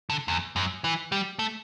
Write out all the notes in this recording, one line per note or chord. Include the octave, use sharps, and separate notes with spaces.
D3
E2
F#2
E3
G3
A3